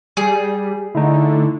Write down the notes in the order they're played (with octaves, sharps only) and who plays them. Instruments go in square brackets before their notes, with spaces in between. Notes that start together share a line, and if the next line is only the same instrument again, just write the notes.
[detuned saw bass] G3 [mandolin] G#4
[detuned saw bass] D3 [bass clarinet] A3 [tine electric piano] D#4 E4